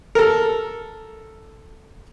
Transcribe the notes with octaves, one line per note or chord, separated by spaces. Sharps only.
A4 A#4